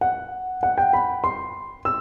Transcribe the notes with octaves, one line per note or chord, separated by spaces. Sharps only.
F#5
F#5
G5
B5
C6
E6